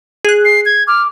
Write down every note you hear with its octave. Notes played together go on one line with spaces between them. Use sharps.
G#4 F#6
C7
G#6
D6 F6